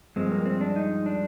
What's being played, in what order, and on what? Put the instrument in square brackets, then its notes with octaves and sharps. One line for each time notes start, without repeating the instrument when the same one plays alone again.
[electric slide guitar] G2 F3 G#3 C4
A#3
C4
D4
D#4
D4